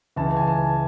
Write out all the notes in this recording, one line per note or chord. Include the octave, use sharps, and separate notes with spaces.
C#2 C#3 E3 A5
G#5
A5